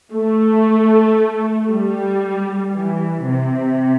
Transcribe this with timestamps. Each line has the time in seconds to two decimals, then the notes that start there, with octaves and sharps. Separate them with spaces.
0.13 A3
1.69 G3
2.73 E3
3.26 C3